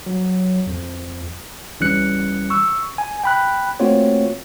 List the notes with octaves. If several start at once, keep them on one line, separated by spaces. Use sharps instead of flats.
F#3
F2
C#2 E3 G3 C#4 F#6 C#7
C#6 E6
G#5
G5 B5 F#6
A3 A#3 C4 F4 F#4 C#5